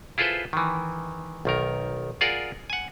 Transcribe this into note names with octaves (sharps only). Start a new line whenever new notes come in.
E4 F4 G#4 A4 B4 C5
D#3 E3
B1 D#3 A#4
F4 G#4 A#4 D5 F#5
F#5 G#5